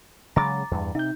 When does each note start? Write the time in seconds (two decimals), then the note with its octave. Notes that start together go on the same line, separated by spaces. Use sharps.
0.36 C#3 F#3 G#3 A#5 D6 A6
0.71 E2 G2
0.95 C3 D#4 G6